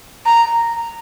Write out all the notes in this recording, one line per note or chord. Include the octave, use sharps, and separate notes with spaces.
A#5